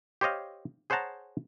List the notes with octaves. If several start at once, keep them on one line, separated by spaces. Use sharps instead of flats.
G4 C5 C#5 D#5 F5
G#4 C5 C#5 F#5 A5 A#5